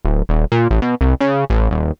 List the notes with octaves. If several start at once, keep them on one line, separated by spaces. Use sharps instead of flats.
D1
D#1
A#2
A1
B2
C2
C#3
A1
D#1